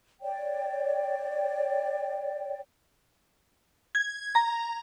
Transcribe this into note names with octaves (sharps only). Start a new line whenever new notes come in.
C#5 D5 G5
G#6
A#5